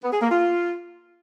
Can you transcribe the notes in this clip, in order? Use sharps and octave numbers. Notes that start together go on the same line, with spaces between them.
B3
G#4
A#3
F4